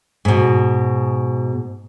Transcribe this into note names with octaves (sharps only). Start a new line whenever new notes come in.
G#2 B2